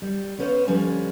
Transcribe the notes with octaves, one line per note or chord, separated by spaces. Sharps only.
G3
B3 C#4 B4 C5 D#5 F5
D3 F3 G3 C#4